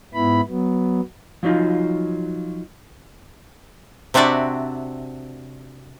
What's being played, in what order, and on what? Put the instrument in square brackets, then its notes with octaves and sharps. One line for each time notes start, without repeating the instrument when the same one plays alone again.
[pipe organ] G#2 B3 E4 B5
F#3 B3
[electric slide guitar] F3 F#3 C#4 D#4 F4
[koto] C3 C4 D4 F#4 D5 E5